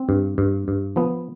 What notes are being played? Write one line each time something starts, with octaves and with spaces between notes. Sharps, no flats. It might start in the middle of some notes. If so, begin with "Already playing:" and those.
Already playing: C4
G2
G2
G2
F3 B3